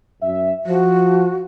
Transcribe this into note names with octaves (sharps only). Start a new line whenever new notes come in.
F#2 E5
F3 F#4